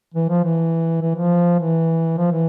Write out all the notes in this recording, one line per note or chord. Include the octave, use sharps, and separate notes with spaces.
E3
F3
E3
E3
F3
E3
F3
E3